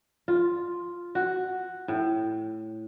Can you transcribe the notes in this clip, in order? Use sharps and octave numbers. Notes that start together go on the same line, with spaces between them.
F4
F#4
A2